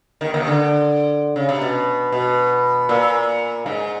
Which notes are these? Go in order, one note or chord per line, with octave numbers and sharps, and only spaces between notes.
D#2 D#3
D#2 D#3
D3
C#3
C3
B2
B2
A#2
G#2